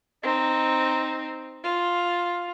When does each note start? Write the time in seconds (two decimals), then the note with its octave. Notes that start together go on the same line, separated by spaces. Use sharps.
0.23 C4 D#4
1.64 F4